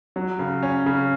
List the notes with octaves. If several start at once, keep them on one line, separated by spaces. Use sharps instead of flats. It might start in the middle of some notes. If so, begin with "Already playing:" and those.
F#3
C#3
C#4
C#3